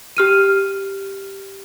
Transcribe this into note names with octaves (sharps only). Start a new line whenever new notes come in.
G4 F6 D#7